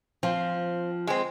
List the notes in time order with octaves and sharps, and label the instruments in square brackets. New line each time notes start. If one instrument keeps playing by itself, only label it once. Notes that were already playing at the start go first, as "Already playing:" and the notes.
[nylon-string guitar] F3 [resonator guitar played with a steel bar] C4
[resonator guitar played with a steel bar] G#3 C4